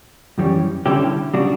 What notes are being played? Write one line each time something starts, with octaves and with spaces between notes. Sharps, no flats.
F#2 E3 G3 C#4
D3 G3 C#4 E4 G4
C#3 G3 D4 F#4